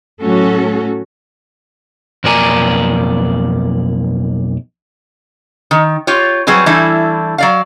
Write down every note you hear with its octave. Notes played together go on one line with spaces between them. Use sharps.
A2 F#3 A3 C#4 F#4 A4
B1 F2 A#3 D5 G#5 A#5
D#3
F4 G4 C#5
F#3 G3 C4 G#4 B4
E3 G3 A3 D4 E4
F#3 D5 F5